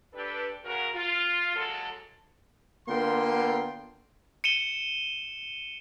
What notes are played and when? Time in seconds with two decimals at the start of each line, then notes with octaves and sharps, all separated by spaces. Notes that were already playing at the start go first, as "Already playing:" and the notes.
0.13 D4 G4 A4 B4
0.64 C#3 F#4 A#4
0.95 F4
1.56 F#3 G#3 A#3 A4
2.88 D3 A#3 B3 F4 G5 C6
4.44 C#7 D#7 E7 G7